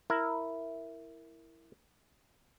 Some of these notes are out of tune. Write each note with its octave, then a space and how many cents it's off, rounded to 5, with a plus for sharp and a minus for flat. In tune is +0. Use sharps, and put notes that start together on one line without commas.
E4 +0 A#4 -5